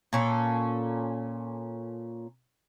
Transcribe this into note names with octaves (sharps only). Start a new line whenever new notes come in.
A#2 C#4 A4